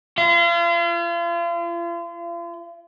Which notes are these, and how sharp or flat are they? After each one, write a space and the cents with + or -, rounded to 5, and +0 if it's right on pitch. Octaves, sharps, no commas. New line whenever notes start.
F4 -40